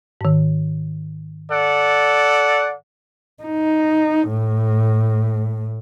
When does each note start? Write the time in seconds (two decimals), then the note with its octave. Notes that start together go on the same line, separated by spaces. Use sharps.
0.21 G#2 D#3
1.52 A4 D5 F#5
3.43 D#4
4.29 A2